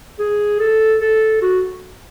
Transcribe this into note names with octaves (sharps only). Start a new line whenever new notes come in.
G#4
A4
A4
F#4